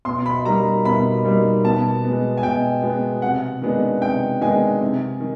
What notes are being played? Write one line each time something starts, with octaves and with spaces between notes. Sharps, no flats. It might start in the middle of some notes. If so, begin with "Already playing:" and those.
B2 C6
B5
G3 A#3 D#4 A#5
B2 B5
G3 A#3 D#4
B2 A5
G#3 B3
G#5
B2 G5
G#3 B3
C3 F#5
D#3 G#3 B3 D4
C3 G5
D#3 G#3 B3 D4 G#5
C3
D#3